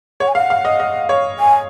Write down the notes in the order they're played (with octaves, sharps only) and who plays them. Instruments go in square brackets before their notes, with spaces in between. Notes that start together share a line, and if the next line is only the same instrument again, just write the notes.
[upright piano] C#5 [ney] F#5
[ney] G#5
[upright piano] F5 [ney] F#5
[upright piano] F5
D#5
D#5
C#5
[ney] G#5